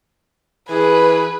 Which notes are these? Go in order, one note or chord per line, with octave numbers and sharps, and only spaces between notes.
E3 G#4 B4